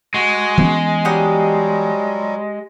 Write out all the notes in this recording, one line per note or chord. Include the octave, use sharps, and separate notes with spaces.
G#3 F#4
E3 B3 C#4
F#3 G3 G4 D#5 F#5